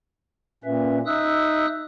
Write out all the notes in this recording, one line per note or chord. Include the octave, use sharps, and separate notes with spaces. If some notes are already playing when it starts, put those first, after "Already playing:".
A#2 C#4 B4 E5
D#4 E5 D#6 E6 F#6